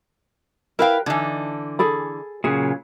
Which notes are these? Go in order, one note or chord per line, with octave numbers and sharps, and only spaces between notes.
E4 A#4 B4 F5 G5
D3 E3 D#4
G#4 A4 B5
A#2 C#3 F#3 G#4